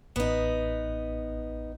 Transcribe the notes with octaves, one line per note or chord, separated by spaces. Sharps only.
A1 B3 D#4